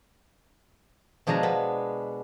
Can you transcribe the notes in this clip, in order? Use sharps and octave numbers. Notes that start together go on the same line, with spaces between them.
B2 F3 G#3 D4 G#5 A#5
B3